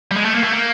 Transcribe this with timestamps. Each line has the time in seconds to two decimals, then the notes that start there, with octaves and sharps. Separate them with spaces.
0.11 G3
0.16 G#3
0.25 A3
0.34 A#3
0.44 A3
0.53 A#3